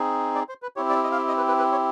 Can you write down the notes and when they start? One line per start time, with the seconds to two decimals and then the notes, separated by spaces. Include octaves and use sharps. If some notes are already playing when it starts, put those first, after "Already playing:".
Already playing: C4 D#4 G#4
0.35 D5
0.49 C5
0.62 B4
0.76 C4 E4 G4 C#5
0.89 D5
1.04 D#5
1.12 F5
1.18 E5
1.28 D#5
1.37 B4
1.48 B4
1.58 B4
1.72 C#5